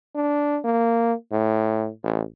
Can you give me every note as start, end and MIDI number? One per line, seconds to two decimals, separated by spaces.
0.15 0.59 62
0.64 1.13 58
1.32 1.89 45
2.04 2.22 33